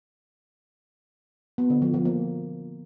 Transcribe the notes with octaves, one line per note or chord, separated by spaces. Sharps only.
B3
D3
F3
F3
A#3